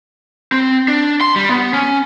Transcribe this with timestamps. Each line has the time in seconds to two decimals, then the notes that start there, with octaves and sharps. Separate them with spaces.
0.52 C4
0.88 D4
1.21 C6
1.36 G3
1.49 B3
1.74 C#4